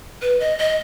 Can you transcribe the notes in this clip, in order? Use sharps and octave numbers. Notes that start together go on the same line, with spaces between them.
B4
D#5
D#5